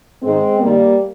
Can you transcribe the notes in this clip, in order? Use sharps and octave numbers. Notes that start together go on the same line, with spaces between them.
G#2 D#3 G#3 C4
G2 D#3 G3 A#3